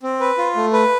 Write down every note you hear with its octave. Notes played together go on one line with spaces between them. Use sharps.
C4
B4
F4
A3
B4